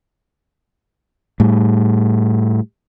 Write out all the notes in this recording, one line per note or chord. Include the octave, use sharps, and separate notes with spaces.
A2 G3